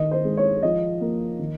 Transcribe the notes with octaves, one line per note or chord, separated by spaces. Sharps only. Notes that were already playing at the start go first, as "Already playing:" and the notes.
Already playing: D#3 D#5
C5
G#3
C#5
F3 D#5
A#3
D#3